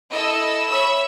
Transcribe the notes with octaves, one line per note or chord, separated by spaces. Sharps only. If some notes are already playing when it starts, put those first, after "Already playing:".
E4 A4 D#5 E6
C#5 E5 B5 E6